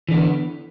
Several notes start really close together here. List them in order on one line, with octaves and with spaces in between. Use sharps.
E3 D3 B3